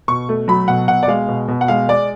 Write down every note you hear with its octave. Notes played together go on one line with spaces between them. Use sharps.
B2 C#6
A3
F#3 B5
B2 F#5
B2 F#5
D5
G#3 F5
B2
B2
F#5
G#3 F5
G#3 D5